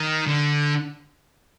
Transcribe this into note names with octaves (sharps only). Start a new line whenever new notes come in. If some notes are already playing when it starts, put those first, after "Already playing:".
Already playing: D#3
D3